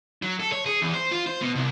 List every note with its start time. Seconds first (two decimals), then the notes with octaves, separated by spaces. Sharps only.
0.22 F#3
0.40 A4
0.52 C#5
0.66 G#4
0.82 E2
0.94 C5
1.12 F4
1.26 C5
1.42 B2
1.55 C2